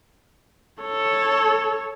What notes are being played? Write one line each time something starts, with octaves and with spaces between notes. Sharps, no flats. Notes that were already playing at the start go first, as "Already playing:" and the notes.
A4 C#5